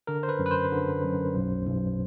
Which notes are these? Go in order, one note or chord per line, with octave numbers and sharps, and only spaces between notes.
D3 A#4
C5
B4
F#2
B4
C5
D3
F#2
B1
B1